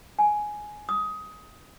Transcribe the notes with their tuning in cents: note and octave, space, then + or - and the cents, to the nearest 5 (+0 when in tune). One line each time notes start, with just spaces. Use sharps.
G#5 +10
D#6 +15